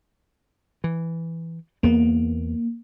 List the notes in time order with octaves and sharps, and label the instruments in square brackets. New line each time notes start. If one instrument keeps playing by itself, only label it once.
[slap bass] E3
[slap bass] E2 B3 [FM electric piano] A#3